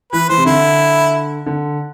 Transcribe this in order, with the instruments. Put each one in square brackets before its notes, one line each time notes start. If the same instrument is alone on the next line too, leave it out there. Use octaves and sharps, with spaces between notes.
[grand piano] E3 [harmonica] B4
[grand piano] E3 [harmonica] C5
[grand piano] C3
[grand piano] D3 [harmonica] E4
[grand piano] D3